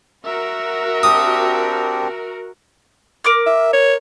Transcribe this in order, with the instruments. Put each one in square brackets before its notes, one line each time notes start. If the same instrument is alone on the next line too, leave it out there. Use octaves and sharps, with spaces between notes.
[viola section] F#4 A#4 [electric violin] E5
[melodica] C4 D4 G4 [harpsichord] D#6
[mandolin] A#4 D6 F6
[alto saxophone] E5
C#5